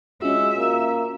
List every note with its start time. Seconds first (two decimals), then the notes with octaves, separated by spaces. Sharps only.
0.22 G#3 C#4 F4 F#4 E5
0.57 A#3